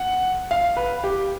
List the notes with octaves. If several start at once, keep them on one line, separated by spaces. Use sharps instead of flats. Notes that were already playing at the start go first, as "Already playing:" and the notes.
Already playing: F#5
F5
B4
G4